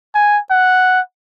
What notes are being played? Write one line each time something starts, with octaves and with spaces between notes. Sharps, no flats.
G#5
F#5